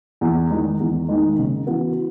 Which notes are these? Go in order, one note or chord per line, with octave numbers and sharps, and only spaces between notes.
E2
D#3 G#3 D#4
E2
D#3 G#3 D#4
C#3
E3 B3 F#4